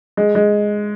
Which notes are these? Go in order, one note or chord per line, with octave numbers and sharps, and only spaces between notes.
G#3
G#3